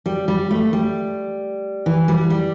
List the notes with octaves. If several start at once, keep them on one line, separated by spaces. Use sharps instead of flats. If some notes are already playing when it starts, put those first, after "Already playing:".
G3
G3
A3
G3
E3
G3
G3